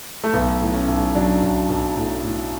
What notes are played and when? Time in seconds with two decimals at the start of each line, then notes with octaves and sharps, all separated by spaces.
0.24 A3
0.33 B1 B3
0.61 A2
0.74 C#4
0.88 B1
1.15 F#3 D4
1.42 B1
1.69 B1
1.97 A2
2.23 A2